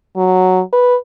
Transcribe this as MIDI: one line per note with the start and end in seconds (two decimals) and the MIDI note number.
0.16 0.61 54
0.73 0.96 71